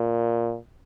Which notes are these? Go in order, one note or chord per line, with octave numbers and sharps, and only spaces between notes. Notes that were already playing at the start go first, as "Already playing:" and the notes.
Already playing: A#2